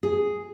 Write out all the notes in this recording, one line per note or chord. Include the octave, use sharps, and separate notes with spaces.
G#4